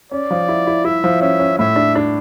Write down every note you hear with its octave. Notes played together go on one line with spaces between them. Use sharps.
C#4 D5
F3
E4
E4
E4 E5
F3
C#4 E5
C#4
A2 E5
D4
D4